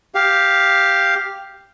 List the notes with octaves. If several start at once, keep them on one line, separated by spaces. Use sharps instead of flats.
G4 F5